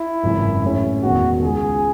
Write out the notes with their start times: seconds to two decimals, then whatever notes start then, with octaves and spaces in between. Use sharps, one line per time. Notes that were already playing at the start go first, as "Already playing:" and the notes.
Already playing: E4
0.23 G#1 F#2 C#3 E3 G#3
0.63 A2 E3 G#3 C#4
1.02 E1 E2 D#3 G#3 F#4
1.42 C#2 C#3 G#3 G#4